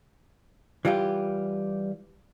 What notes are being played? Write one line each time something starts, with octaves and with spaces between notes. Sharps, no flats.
E3 G3 F4 G4